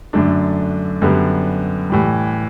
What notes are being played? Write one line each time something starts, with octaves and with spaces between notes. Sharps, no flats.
F#2 D3 A3 D4
F#2 D3 G3 B3
A2 E3 G3